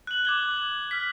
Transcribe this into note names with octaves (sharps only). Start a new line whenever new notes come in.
F#6 F#7
D6 G#6 G7
F6 B6